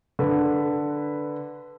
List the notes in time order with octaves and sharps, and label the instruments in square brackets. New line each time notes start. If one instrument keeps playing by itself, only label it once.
[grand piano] D3 B4